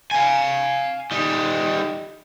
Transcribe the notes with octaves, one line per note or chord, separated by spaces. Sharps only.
F5 G#5
G3 D#4